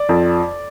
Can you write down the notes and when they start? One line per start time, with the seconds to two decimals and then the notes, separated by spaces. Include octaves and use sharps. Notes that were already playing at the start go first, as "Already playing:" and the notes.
Already playing: D5
0.09 F2